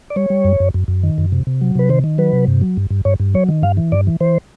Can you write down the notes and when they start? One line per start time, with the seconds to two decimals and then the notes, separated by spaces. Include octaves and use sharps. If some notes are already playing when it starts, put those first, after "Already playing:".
0.10 D5
0.16 G3 C#5
0.30 G3
0.45 F#2
0.60 F#2
0.74 F#2
0.88 F#2
1.03 D#3
1.18 F#2
1.32 C3
1.47 C3
1.61 F#3
1.75 C3 B4
1.89 D#3 C5
2.04 D#3
2.18 F#3 B4
2.33 C3
2.47 G2
2.61 F#3
2.77 G2
2.90 G2
3.05 G2 C#5
3.20 G2
3.34 F#3 C#5
3.49 D#3
3.63 G2 F5
3.77 E3
3.92 G2 D5
4.07 E3
4.20 E3 C5